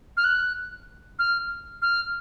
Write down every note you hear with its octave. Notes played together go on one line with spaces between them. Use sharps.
F6
F#6
F6
F6